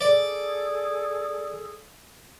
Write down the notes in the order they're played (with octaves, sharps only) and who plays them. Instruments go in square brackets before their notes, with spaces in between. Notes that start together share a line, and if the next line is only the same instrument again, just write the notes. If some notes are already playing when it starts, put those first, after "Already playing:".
[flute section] G#4 A4 [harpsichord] D5